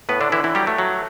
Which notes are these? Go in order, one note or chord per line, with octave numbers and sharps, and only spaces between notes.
A2 B3 B4
D3 D4
D3 E3 E4
E3 E4
F#3 G3 G4
A3
F#3